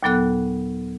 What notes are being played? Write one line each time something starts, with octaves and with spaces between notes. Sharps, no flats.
D#2 A#2 F#3 B3 A4 F#6